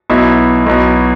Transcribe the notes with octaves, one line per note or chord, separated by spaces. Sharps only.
B1 B2 E4
B1 B2